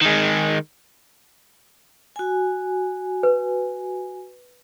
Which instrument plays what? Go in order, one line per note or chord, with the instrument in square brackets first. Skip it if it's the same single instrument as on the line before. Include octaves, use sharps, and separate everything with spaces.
[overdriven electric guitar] D#3 G#3
[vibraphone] F#4 G#5
[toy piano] B4